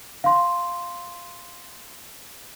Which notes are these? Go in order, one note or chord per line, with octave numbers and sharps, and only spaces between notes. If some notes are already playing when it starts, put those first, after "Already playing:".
F5 C6